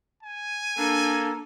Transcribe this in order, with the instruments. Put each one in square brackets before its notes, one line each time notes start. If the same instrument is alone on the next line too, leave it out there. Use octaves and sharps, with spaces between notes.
[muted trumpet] G#5
[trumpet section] A#3 A4 [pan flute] D4